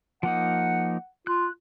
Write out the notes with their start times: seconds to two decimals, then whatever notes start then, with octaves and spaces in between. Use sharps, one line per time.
0.23 F3 A#3 D#4 F#5
1.27 F4 F#6